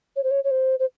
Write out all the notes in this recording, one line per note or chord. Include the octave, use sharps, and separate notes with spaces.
C#5
C5
C#5
C#5
C5
C5